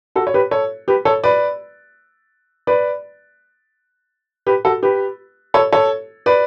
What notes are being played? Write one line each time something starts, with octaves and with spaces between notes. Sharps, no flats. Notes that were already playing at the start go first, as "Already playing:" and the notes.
F#4 A4
C#5
G4 B4
A4 C#5
G4 B4
A4 C#5
B4 D5
B4 D5
G4 B4
F#4 A4
G4 B4
A4 C#5
A4 C#5
B4 D5